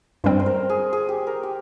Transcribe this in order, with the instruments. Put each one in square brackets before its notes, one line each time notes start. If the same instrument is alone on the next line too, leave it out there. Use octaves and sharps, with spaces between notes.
[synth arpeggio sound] G2 G3 C4 [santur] C5
[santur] C5
A#4
G#4
G#4
G4
A#4
G4